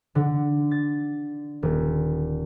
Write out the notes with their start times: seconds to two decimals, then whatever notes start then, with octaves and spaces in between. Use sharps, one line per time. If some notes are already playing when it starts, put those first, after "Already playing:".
0.15 D3
0.71 A6
1.63 D#1